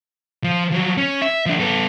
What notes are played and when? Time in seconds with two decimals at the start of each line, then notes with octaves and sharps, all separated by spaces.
0.44 F3
0.72 F3 F#3
0.98 C#4
1.22 E5
1.46 F3 D4
1.60 B3 A4